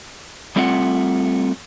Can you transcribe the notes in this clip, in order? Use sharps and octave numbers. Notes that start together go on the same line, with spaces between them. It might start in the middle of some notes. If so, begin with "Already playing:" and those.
G3 A3 C4 F4 F5 F#5